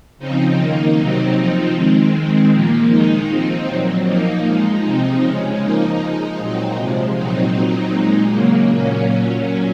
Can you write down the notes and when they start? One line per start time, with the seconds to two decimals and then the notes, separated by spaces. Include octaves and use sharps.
0.19 C#3 F3 C4 D#4
0.58 D#3 A#3 D#4
0.96 C3 F#3 C4 D#4
1.35 F3 C4 D#4
1.73 D#3 G#3 C4
2.13 D#3 G#3 C4
2.51 A#2 F3 A#3
2.89 D#3 G#3 D#4
3.28 F3 C4 D#4
3.67 A#2 F#3 C4
4.06 F3 A#3 D#4
4.44 F3 G#3 D#4
4.83 C3 F3 C4 D#4
5.21 C#3 G#3 C#4
5.60 F3 A#3 D#4
6.00 F3 G#3 D#4
6.38 A#2 F#3 C4 D#4
6.76 C3 F3 G#3
7.15 A#2 F#3 C4 D#4
7.53 A#2 F#3 C4 D#4
7.93 A#2 G#3 D#4
8.32 C#3 F#3 A#3
8.70 A#2 F#3 A#3 C#4
9.09 A#2 F#3 C#4